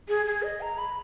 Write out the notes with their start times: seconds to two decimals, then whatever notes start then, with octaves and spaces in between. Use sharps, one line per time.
0.08 G#4
0.26 G#4
0.43 D#5
0.61 A#5
0.78 B5